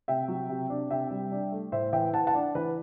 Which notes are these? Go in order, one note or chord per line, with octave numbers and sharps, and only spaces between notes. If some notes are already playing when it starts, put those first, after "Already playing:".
C3 E5 G5
F#3
C3
D4
C3 E5 G5
G3
D4
A3
A2 C5 E5
E3 E5 G5
E3 F#5 A5
F#5 A5
D4
E3 B4